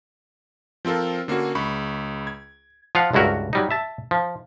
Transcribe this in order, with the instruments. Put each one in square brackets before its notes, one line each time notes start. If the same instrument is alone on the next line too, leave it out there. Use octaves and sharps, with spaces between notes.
[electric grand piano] F3 C4 F4 A4 A#4
D3 A#3 C#4 F#4
C#2 B5 C#6
G#6
[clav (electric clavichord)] F3 F4 F5 F#5
C#2 G2 E4 F#4 A#4
F#3 G3 D#4
E5 A5
F3